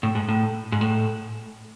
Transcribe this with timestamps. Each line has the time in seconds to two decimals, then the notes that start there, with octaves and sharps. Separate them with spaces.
0.03 A2
0.15 G#2
0.29 A2
0.72 G#2
0.81 A2